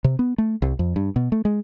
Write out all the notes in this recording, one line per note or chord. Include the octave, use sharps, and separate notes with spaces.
C3
B3
A3
C2
F2
G2
B2
A3
G#3